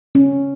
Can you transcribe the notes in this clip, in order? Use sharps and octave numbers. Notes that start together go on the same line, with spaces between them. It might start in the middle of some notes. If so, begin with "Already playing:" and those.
C#4